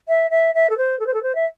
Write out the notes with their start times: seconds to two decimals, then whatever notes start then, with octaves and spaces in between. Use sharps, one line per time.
0.08 E5
0.30 E5
0.55 E5
0.70 A4
0.78 C5
0.99 A4
1.07 C5
1.14 A4
1.23 C5
1.35 E5